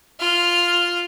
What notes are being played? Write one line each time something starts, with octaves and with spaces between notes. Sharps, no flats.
F4 F6